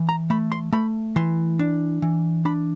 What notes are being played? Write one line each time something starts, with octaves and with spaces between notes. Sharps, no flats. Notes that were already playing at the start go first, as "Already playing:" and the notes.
Already playing: E3
A#5
A3 B5
C6
A3 B5
E3 C6
D4
E3
D4 B5